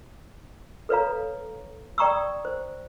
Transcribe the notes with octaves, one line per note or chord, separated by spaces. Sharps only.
A4 B4 C#5 F5 A#5
D5 G5 A#5 C#6 D#6 E6
C5